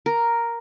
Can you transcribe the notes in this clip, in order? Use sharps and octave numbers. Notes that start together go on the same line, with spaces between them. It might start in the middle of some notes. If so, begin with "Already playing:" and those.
A#4